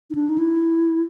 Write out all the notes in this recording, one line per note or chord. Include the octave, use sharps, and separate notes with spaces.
D#4
D4
D#4
E4